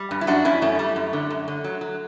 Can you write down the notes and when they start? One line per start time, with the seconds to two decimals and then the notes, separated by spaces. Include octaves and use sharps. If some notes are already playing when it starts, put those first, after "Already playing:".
Already playing: G3
0.11 G2
0.21 E4
0.27 F#2 D4 F#4
0.45 F#2 C#4 E4
0.62 F#2 A3 C#4
0.79 G3 A3
0.96 F#2
1.13 D3
1.30 F#2
1.48 D3
1.64 F#3
1.81 F#3